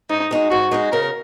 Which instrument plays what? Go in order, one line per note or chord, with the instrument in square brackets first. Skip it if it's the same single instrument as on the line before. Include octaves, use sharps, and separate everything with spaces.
[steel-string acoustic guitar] G#2 [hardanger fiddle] D#4
[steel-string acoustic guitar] G#3 D#4 F#4
[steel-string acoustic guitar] G#2 [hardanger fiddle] F#4
[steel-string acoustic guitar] G#3 D#4 F#4
[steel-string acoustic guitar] C#3 [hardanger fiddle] A#4